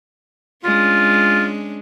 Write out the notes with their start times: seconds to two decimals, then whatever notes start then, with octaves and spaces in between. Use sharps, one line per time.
0.65 G#3 C#4 D4 F4